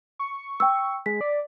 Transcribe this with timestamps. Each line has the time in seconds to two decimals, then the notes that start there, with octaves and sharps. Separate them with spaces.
0.19 C#6
0.60 G5 E6
1.06 G#3 B6
1.21 D5